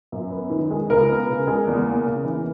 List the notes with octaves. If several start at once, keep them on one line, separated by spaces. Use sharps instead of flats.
F#2
B3
D#3
G#3
C#2 A#4
B3
C#3
G#3
E2
A#3
C#3
E3